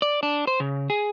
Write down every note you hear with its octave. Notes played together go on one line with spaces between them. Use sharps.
D5
D4
C5
C#3
G#4